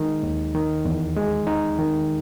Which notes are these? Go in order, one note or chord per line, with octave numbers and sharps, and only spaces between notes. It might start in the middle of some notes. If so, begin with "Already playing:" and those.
Already playing: D#3 G#3 D#4
D#2
D#3
E2
G#3
D#4
D#3